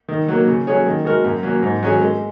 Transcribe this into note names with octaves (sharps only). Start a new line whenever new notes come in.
D#3
F#3 A#3
C#3
F#3 C#4 G#4 C#5
D#3
G#3 F#4 A#4
F#2
F#3 A#3 C#4
G#2
F#3 C#4 G#4
G#3